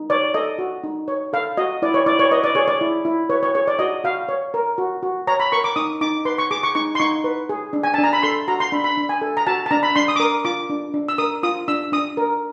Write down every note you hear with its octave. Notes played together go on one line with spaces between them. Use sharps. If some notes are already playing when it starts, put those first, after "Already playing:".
Already playing: D#4
C#5 D5
A4 D#5
F#4
D#4
C#5
A4 F5
F#4 D#5
E4 D5
C#5
E4 D5
C#5
B4 D#5
D5
G#4 C#5
D5
E4
E4
B4 C#5
C#5
G#4 C#5
D5
F#4 D#5
F#4 F5
C#5
A#4
F#4
F#4
C#5 A#5
B5
A#4 C#6
D6
D#4 D#6
D#4 D6
B4 C6
C#6
G#4 D6
C#6
D#4 C#6
C6
D#4 C#6
B4
G#4
D4
G#5
D4 A5
A#5
B5
A4 C6
F#4 A#5
C6
D4 B5
B5
D4
G#5
A4
A#5
F#4 A5
A5
D4 A#5
B5
D4 C6
D#6
D6
A#4 D#6
F4 D6
D4
D4
E6
A#4 D#6
F4 D#6
D4 E6
D4 D#6
A#4